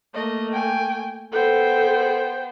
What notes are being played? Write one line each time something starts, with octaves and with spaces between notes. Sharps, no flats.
A3 A#3 D#5
G5 G#5
B3 A4 C5 G5